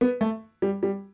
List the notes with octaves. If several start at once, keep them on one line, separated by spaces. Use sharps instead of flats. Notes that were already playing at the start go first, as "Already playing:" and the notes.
B3
A3
G3
G3